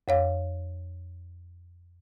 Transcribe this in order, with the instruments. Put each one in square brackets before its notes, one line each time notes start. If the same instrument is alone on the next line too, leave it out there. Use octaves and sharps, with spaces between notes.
[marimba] F2 C#5 F5